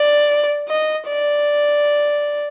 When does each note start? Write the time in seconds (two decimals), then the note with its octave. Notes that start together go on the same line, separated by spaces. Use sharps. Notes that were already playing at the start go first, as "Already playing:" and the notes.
Already playing: D5
0.69 D#5
1.07 D5